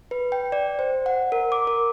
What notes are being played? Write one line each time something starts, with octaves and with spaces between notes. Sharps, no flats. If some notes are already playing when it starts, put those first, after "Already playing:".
B4
G5
D5
C5
F#5
A#4
D6
A#4